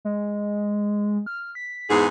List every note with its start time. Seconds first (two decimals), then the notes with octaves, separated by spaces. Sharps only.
0.05 G#3
1.26 F6
1.55 B6
1.90 E2 G#2 G#4